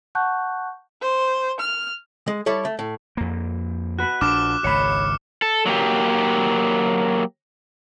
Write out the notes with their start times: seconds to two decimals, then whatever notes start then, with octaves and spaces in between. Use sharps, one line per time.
0.15 F#5 A5 C#6 F#6 G6
1.02 C5
1.60 F6
2.28 G#3
2.46 G3 E4 A4 C#5
2.65 A3
2.79 A2
3.17 F2 A#3
3.99 F#4 B4 F#6
4.21 A#1 D4 D6 F6 E7
4.64 G#1 C#2 C#5 B5 C#7
5.42 A4
5.66 F#3 A#3 G4